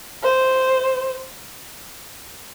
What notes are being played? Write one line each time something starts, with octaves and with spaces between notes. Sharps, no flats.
C5